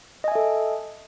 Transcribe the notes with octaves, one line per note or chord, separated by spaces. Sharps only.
A4 D#5 E5 G#5